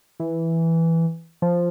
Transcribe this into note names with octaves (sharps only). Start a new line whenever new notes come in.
E3
F3